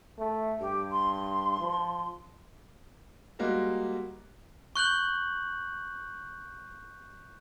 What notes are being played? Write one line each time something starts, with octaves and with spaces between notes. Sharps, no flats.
A3
G2 G4
C6
F3
G3 G#3 A#3 F#4
C#6 F#6 G6 F#7